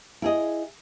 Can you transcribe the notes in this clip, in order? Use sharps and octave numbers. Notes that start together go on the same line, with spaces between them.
E4 G#4 D#5